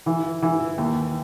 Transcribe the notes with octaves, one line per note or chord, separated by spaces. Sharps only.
E3
E3
D#2